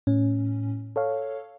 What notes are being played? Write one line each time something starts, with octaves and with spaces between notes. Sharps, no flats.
A2 C#4
A4 C#5 F5